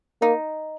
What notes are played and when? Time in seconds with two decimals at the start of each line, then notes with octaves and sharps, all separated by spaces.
0.21 A#3 D#4